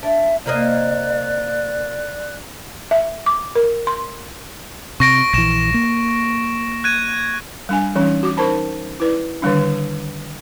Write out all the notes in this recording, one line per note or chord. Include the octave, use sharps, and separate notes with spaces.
D4 E5
C3 A#3 D5 D#5 F#6
E5
D6
A#4
C6
C3 C#6 A#6 D7
A#1 E3 A#6 E7
A#3
F#6 G#6 D#7
G3 D4 G#5
E3 G3 C#4 D#4
F#4 D6
D#4 A#4 C5 A5 B5
E4 B4 D5
D3 D#3 G3 D4